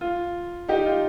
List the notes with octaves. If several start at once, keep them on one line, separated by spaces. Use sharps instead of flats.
F4
D#4 G4
F4